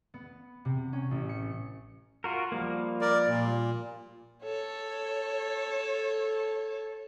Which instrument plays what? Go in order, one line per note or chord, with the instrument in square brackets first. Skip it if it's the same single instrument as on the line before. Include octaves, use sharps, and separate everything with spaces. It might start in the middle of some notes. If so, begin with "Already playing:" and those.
[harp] B3
C3
C#4
A1
C#7
[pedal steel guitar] F4 F#4 A#4
F3 G3 A#3
[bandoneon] A#4 D5
A#2
[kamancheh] A4 C#5